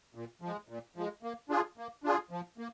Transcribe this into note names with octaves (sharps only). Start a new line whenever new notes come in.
A#2
F3
G#3
A#2
F3 G#3
A#3
D4 F4 G#4
A#3
D4 F4 G#4
F3
A#3